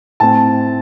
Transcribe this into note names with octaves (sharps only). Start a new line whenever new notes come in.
A2 A3 C4 A5